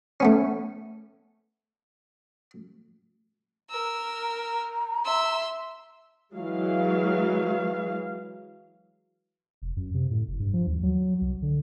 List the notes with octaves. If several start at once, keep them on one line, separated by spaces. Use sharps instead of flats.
A3 B3 C#4
A#4 E6
A#5
E5 C6 E6
E3 F#3 G#3 F5
F1
F#2
C3
A2
F#1
G2
F3
D#2
F#3
C2
D3